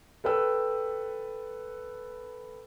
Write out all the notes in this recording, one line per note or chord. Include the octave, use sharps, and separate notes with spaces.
A4 B4 G5 E6